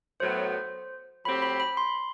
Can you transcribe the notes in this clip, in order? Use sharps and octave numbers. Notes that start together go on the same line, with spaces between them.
A2 F#3 B3 C5
A2 F#3 C4 G4 B5
B5
B5
C6